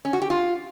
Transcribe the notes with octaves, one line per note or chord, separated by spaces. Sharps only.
C#4
F#4
G4
F4